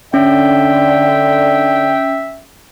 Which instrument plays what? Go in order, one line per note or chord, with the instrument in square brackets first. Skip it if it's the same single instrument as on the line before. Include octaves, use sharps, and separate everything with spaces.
[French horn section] D3 D5 [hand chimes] C#4 [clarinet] E5 [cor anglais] G5